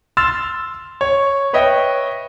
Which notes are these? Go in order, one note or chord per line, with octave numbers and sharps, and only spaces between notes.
C6 E6 F6 A6 E7
C#5
B4 C#5 D#5 E5 G5